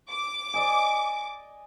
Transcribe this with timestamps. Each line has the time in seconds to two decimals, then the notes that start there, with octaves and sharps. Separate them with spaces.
0.10 D6
0.54 D5 D#5 G#5